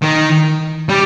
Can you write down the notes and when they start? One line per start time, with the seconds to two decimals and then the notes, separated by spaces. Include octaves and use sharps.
0.02 D#3
0.89 G3